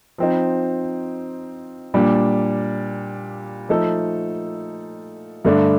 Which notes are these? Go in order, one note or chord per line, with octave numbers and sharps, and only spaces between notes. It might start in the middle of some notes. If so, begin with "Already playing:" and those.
F3 C4 D#4
A#2 G3 D4
F3 A3 D#4 A4
G2 D3 A3 D4